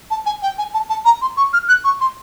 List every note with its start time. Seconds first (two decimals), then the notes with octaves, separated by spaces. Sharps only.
0.10 A5
0.26 G#5
0.42 G5
0.58 G#5
0.74 A5
0.89 A5
1.05 A#5
1.21 C6
1.37 C#6
1.53 F6
1.68 F#6
1.84 C#6
2.00 C6